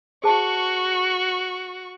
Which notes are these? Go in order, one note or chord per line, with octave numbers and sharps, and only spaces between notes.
F#4 G#4 C5 A5 C#6